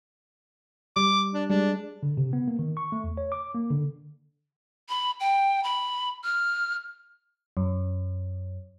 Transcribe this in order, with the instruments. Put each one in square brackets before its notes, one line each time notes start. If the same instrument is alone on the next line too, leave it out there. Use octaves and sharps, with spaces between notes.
[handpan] G3 [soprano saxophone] D6
[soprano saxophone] D4
[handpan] G3 G#3 [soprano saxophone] D4
[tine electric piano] D3
C3
B3
A#3
D#3
C#6
A3
E2
C#5
D6
A#3
D3
[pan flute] B5
G5
B5
F6
[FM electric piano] F#2